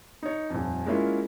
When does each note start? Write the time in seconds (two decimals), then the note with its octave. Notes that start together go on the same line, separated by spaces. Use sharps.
0.23 D#4 C#5
0.50 D#1 F2
0.86 G#3 A#3 C#4 E4 F4